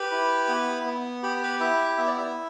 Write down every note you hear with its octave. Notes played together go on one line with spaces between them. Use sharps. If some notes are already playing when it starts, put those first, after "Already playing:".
Already playing: G4 B4 B5
E4
B3
B3
G4 B5
B4 B5
E4 E5
B3 E5
D5
E4 E5